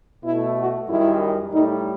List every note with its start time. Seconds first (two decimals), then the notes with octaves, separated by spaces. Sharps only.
0.24 B2 A3 E4
0.57 F#4
0.88 F#2 D#3 G3 E4
1.52 A2 G3 D#4